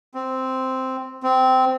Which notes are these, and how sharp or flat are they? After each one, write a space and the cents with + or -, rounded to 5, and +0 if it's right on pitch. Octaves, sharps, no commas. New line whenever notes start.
C4 -5
C4 -15